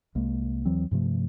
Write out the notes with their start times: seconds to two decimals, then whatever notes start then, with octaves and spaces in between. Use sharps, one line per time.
0.15 C2 G#3 A#3
0.65 D#2 E3 F#3 C4
0.91 G2 C3 F3 A3